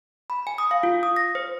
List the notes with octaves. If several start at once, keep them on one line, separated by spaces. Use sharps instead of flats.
B5
G#5
D#6
F5
F4
D#6
A#6
C5